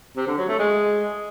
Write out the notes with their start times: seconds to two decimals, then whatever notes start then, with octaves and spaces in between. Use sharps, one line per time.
0.16 C3
0.27 D3
0.38 F#3
0.48 A3
0.59 G#3